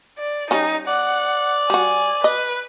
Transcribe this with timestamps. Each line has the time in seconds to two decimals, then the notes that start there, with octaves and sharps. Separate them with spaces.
0.18 D5
0.51 G3 C#4 D#4
0.88 D5 F#5
1.70 G3 F#4 G#5
2.24 B4 D#5